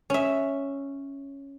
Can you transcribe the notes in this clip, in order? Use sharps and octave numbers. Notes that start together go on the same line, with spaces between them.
C#4 E5